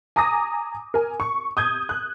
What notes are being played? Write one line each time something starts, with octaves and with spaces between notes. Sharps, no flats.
G#5 A#5 D6 D#6 A#6
A#4 G#5
C#6
D#6 G6 G#6
F#6